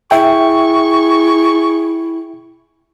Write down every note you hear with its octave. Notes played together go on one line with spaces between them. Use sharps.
E4 G#4 E5 G5 C#6